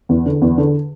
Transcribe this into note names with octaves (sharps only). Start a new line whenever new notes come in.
E2
D3
E2
D3